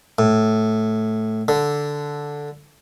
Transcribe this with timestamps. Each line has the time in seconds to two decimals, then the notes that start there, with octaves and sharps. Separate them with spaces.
0.19 A2
1.48 D3